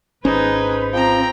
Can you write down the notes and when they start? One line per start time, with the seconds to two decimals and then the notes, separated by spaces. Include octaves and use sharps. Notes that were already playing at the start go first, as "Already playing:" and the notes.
0.25 G#1 C#4 D#4 G#4 B4 C5
0.93 F3 C4 G5 A#5